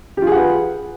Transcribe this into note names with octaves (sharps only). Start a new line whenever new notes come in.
F4 G4 G#4 B4 F#5